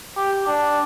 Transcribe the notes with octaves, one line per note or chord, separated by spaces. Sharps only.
G4
D4